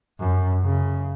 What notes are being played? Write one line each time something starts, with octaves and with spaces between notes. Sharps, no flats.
F#2
C#3